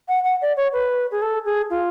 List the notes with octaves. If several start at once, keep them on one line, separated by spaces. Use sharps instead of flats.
F#5
F#5
D5
C#5
B4
G#4
A4
G#4
F4